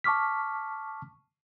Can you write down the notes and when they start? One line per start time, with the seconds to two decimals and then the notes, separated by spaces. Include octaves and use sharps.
0.04 A5 C#6 D6 F6 B6